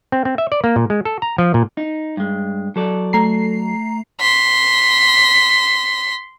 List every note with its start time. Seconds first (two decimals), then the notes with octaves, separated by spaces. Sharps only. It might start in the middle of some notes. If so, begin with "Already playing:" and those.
0.12 C4
0.25 C4
0.38 E5
0.52 D5
0.64 A#3
0.76 A#2
0.90 G#3
1.05 A4
1.22 A#5
1.38 F3
1.54 A#2
1.77 D#4
2.17 G2 G#3
2.76 F#3 A4 D5
3.13 A3 A#5 C7
4.21 C6 B6